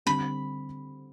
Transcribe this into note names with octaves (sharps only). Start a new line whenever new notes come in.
D3 G3 C4 B5